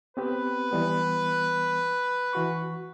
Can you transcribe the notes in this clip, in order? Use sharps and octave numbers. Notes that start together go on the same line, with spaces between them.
B3 C4 G4 B4
E3 G3 B3
E3 F#4 C#6